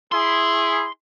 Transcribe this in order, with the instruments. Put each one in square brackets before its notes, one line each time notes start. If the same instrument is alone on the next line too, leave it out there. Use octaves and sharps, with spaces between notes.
[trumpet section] E4 G#4 [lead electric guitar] C6